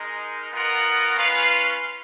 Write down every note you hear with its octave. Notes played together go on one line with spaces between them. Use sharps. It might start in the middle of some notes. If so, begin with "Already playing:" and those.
Already playing: G#3 D#4 A#4
B3 F4 A#4 D#5 F#5
C#4 F4 B4 F5